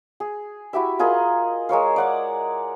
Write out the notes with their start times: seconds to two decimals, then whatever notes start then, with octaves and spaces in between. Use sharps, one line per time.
0.20 G#4
0.73 E4 F#4 G4 E5
0.99 F4 G#4 A#4 D#5
1.69 G#3 A#4 C#5 F5
1.96 D5 F#5 D6